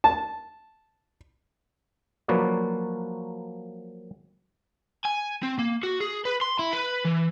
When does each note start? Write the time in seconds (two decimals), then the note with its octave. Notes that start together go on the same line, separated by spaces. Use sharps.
0.04 A5
2.28 F3 F#3 A#3 B4 C#5 D5
5.05 G#5
5.43 C4
5.59 A#3
5.83 F#4
6.00 G#4
6.25 B4
6.42 C6
6.59 E4
6.73 B4
7.05 E3